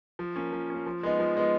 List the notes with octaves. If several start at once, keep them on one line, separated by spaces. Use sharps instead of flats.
F3
A#3 C#4
F3
A#3 C#4
F3
G#3 B3 D#4
F3
G#3 B3 D#4